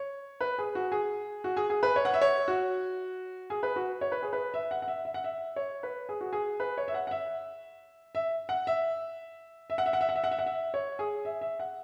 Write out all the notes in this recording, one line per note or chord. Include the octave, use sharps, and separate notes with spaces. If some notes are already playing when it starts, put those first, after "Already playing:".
Already playing: C#5
B4
G#4
F#4
G#4
F#4
G#4
G#4
B4
C#5
F#5
E5
C#5
F#4
G#4
B4
F#4
C#5
B4
G#4
B4
E5
F#5
F#5
E5
E5
F#5
E5
C#5
B4
G#4
F#4
G#4
B4
C#5
E5
F#5
F#5
E5
E5
F#5
E5
E5
F#5
E5
F#5
E5
F#5
E5
F#5
E5
F#5
E5
C#5
G#4
E5
E5
F#5